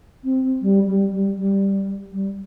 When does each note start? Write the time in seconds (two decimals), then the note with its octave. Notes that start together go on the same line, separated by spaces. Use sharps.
0.24 C4
0.62 G3
0.87 G3
1.12 G3
1.37 G3
2.12 G3